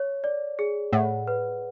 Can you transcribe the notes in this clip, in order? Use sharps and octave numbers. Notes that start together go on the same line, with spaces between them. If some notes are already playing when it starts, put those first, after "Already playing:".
Already playing: C#5
D5
G#4
A2 F#5
B4